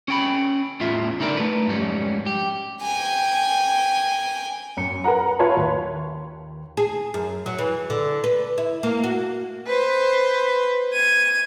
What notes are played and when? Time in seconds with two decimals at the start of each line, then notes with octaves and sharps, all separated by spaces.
0.08 C#4 G5 B5
0.80 E2 A2 F4 E5
1.20 D3 D#4 E4 A#4 D5
1.37 A3 B4
1.67 F2 G#2 G3 C#4
2.26 G4
2.82 G5 G#5
4.77 F#2 C#7
5.04 A#4 B4 F#5 A#5
5.39 F4 B4 C#5 E5 A5 C6
5.57 D#2
6.77 G#4
7.14 F#2
7.46 F#3
7.58 E3
7.90 D3
8.24 B4
8.58 E4
8.83 A#3
9.04 F#4
9.67 B4 C5
10.93 G#6 D#7